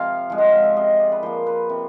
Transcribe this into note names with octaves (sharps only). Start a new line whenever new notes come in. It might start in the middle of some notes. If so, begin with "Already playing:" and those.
Already playing: C3 F3 F5
F3 G#3
F#5
F5
E5
C3 D#5
D5
B4
F3 A#3 C5
B4
C3